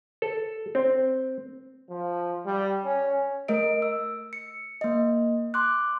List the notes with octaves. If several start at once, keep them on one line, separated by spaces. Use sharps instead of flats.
A4
C4
F3
G3
C#4
A3 A#4 D#5 D7
E6
C#7
A#3 D#5
C6 D6 F#6